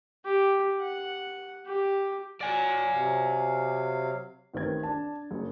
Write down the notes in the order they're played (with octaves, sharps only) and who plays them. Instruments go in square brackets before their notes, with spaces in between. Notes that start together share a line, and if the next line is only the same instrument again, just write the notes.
[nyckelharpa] G4
F#5
G4
[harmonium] F#3 F#5 [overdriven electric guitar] D5 G#5
[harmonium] C3 F#3 F5
[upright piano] A1 D#3 C4 B4 G#6
D4 A5
F#1